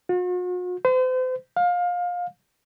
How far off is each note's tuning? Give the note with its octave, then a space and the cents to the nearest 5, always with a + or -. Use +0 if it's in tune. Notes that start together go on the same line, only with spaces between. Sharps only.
F#4 -45
C5 -40
F5 +25